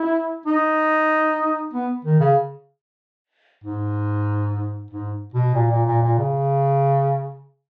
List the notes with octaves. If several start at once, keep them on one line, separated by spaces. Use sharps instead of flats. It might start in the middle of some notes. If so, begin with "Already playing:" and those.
Already playing: E4
D#4
B3
D#3
C#3
G#2
G#2
B2
A#2
A#2
A#2
A#2
C#3